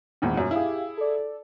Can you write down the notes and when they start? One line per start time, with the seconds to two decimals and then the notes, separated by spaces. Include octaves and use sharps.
0.22 G#1 E2 A#2
0.35 F#2 A#2
0.51 E4 G4 G#4 F5
0.97 A4 D5